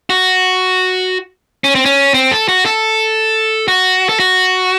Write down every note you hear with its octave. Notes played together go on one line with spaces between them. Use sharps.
F#4
C#4
C4
C#4
C4
A4
F#4
A4
F#4
A4
F#4